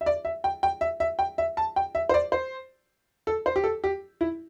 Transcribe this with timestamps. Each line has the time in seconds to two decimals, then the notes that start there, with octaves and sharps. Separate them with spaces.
0.01 E5
0.06 D5
0.25 E5
0.44 G5
0.63 G5
0.81 E5
1.00 E5
1.19 G5
1.38 E5
1.57 A5
1.76 G5
1.95 E5
2.09 C5
2.14 D5
2.32 C5
3.27 A4
3.46 C5
3.56 G4
3.64 A4
3.84 G4
4.21 E4